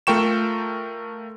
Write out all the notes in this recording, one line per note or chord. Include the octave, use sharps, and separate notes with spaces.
A3 F4 A#4 G5 C#6 E7